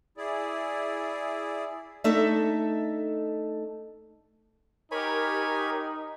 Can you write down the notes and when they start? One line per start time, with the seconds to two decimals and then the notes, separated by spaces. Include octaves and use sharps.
0.17 E4 G#4 D5
2.04 A3 D4 D#4 A4 E5
4.91 D#4 G4 A#4 C#5 G#5 B5